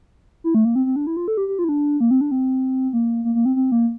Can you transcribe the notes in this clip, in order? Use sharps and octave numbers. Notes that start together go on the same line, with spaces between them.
E4
A3
A#3
C4
C4
D4
E4
F4
A4
G4
G4
F4
E4
D4
A#3
C4
D4
C4
A#3
A#3
A#3
C4
C4
A#3